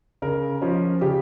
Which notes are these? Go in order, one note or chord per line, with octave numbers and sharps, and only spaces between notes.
C#3 A#4
F3 C#4
C#3 G4